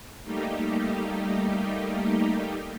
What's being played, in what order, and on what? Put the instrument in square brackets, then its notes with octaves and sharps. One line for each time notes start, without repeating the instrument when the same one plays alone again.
[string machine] G3 A3 A#3 D#4 G4